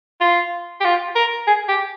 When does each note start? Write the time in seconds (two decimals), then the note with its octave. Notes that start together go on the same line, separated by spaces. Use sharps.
0.21 F4
0.81 G4
0.85 F4
1.15 A#4
1.47 G#4
1.68 G4